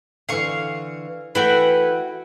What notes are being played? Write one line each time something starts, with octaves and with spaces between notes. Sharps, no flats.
D3 E3 F5 C#6
E3 A3 E4 F#4 B4 G5